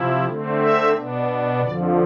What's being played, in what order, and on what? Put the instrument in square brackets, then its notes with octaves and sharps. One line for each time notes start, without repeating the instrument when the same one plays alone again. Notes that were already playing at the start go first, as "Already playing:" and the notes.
Already playing: [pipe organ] C3 F3 E4
D3 A3 C4
E5
B2 B3 D4
F2 D3 F3 D5